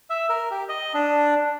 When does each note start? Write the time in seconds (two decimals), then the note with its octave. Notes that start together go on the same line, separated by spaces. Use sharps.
0.10 E5
0.29 A#4
0.51 G4
0.69 D#5
0.94 D4